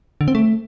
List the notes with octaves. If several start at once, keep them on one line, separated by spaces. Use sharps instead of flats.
D3
C4
A3